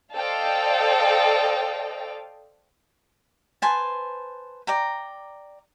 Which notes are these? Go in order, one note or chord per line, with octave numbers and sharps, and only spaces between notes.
A4 C5 D5 D#5 F5 G5
B4 C5 G#5 A5
D5 G5 A#5